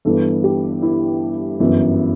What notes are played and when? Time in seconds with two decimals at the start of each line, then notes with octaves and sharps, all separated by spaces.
0.05 G1 G2 E3 A4
0.44 G4
0.82 E4
1.60 G1 F#2 E3